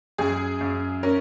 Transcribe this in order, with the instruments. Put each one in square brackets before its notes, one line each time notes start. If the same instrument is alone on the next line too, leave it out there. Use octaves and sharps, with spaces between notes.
[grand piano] F#2 [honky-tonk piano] G#4
[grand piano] F#2
[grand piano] C#4 [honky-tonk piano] A#4